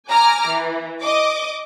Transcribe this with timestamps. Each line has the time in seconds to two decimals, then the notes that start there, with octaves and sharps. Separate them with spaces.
0.10 G#5 A#5 D6 F6
0.48 E3
1.02 D#5 D6